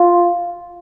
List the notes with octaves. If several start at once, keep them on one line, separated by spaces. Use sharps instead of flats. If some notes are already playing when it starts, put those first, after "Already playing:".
Already playing: F4